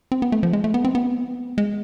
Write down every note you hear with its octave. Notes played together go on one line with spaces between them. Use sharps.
C4
B3
A3
F3
G#3
A3
B3
C4
B3
G#3